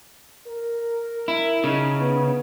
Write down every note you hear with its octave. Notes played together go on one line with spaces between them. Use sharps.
A#4
E4
C#3 D#4
B3